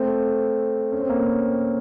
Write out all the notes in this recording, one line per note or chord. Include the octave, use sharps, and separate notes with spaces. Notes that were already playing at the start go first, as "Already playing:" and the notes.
Already playing: A3 C4
C#4
C4
A#3 C#4